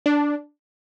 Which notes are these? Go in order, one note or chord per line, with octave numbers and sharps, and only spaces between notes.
D4